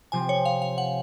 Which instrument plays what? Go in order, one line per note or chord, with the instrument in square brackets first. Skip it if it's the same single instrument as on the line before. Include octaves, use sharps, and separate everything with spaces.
[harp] C3 F3 C4 [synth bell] G#5
[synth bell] C#5
F5
F5
F#5